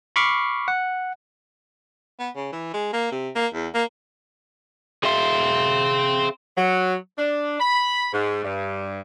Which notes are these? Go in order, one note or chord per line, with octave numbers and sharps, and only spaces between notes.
B5 C#6 D6 F6 C7
F#5
B3
C#3
E3
G#3
A#3
C3
A#3
E2
A#3
C4 G#4 C5 E5 F5
F#3
D4
B5
G#2
G2